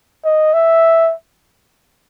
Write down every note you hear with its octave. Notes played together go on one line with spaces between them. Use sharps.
D#5
E5